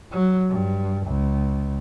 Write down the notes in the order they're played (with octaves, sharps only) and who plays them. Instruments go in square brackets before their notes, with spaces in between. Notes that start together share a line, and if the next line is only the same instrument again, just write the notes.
[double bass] F#3
G2
C#2